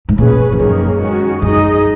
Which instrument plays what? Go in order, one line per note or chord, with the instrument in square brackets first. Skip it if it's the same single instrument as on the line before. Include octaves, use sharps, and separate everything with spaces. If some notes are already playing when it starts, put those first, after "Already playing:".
[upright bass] G#2
[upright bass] A#2 [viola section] C#4 G#4 B4
[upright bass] F2
[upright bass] F#2 [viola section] D#3 A#3 C#4 G#4
[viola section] D#3 G#3 C#4 F#4
[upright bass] F#2 [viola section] G#3 D#4 G#4 D#5